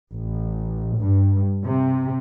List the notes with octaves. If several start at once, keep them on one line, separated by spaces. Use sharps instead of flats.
A1
G2
C3